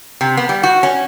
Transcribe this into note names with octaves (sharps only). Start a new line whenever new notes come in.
C3
B3
G3
F#4
C#4